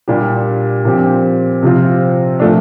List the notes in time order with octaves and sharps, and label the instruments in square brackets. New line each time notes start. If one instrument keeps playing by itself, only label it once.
[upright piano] A#2 G3 D4 G4
A#2 F3 C4 G4
C3 F3 C4 F4
A#2 F3 A3 D4